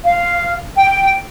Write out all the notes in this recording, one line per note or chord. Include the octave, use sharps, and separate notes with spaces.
F5
G5